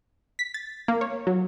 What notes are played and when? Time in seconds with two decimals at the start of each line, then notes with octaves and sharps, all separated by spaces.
0.39 B6
0.54 A6
0.88 A#3
1.01 C#5
1.27 F#3